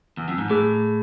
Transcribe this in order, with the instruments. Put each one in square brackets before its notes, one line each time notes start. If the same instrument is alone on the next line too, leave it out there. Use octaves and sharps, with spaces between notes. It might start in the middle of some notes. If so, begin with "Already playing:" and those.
[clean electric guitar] E2
F2
G#2
[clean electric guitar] A2 [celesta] G#4